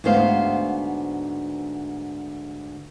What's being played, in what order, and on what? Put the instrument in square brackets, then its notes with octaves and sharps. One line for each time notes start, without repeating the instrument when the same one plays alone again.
[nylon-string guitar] D2 G#2 B3 C5 F5